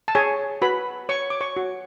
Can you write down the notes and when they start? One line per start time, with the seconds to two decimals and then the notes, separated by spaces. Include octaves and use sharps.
0.08 A5
0.15 G#4 C#5 G#5
0.62 F#4 B4 B5
1.09 C#5 C#6
1.30 D6
1.41 C#5 C#6
1.56 F#4